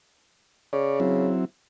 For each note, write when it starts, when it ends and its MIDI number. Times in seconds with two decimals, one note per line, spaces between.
0.73 1.35 49
0.73 0.99 73
0.73 0.99 74
1.00 1.45 54
1.00 1.45 60
1.00 1.45 64